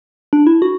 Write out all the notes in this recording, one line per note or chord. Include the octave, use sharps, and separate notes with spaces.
D4
E4
F#4